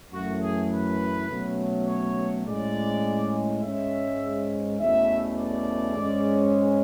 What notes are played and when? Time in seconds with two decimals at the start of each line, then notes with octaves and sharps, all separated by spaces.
0.12 F#2 E3 A3 F#4
0.41 G#4
0.71 B4
1.29 B2 F#3 A3 C#4
1.87 C#5
2.46 A2 G#3 C#4 D5
3.63 G#2 G#3 C#4 E5
4.79 E2 B2 A3 C#4 E5
5.38 D5
5.96 G#2 G#3 C#4